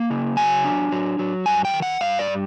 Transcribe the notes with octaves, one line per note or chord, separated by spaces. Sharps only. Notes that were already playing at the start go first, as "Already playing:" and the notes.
Already playing: A#3 A5
C#3
F#3 G#5
D4
F#3
F#3
G2 G#5
G5
D#3
F#5
G2 F5
D5
G3